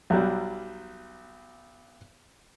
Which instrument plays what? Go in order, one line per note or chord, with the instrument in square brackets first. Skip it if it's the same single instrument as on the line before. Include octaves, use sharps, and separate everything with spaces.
[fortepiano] B1 F#3 G3